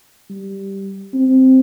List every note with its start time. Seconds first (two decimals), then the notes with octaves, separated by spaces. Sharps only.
0.30 G3
1.14 C4